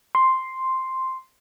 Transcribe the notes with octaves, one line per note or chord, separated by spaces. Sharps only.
C6